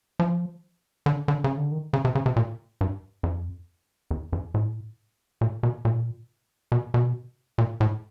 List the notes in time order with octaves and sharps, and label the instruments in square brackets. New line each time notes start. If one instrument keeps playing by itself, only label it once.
[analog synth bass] F3
D3
D3
C#3
D3
D#3
C#3
C3
C#3
C3
A#2
G2
F2
E2
F2
A2
A#2
B2
A#2
B2
B2
A#2
A2